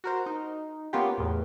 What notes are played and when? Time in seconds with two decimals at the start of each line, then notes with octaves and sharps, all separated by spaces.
0.04 F#4 A#4 C5
0.26 D#4
0.93 A#3 B3 C#4 F4 G4
1.18 E2 A2